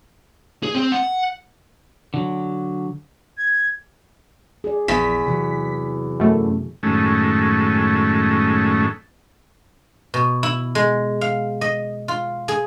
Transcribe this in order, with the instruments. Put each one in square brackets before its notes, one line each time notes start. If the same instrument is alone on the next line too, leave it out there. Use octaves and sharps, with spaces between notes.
[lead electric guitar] G#4
C4
F#5
[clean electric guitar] D3 F#3
[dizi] G#6
[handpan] G#4 D5
[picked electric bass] A#1 [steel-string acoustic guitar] E2 [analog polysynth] B6
[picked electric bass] C3 E3 F#3
[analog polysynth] F#2 A3
[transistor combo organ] F#2 A2 D#3 G#3 A3 C#4
[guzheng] B2
E4
G#3
F5
D#5
F4
G#4